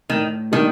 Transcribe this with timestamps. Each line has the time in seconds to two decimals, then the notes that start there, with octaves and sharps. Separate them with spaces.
0.10 A2 D#3
0.52 D#3 G3 A#3 D4